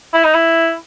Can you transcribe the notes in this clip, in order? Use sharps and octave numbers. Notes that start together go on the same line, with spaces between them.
E4
D#4
E4